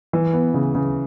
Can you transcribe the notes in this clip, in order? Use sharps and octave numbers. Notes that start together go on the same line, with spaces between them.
E3
B3
C#3
C#3